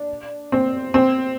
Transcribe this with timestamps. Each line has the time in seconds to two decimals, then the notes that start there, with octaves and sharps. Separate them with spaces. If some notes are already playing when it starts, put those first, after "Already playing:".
Already playing: D4
0.52 C4
0.94 C4